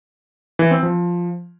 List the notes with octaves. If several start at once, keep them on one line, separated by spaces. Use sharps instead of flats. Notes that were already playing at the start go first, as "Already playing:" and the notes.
E3
C4
F3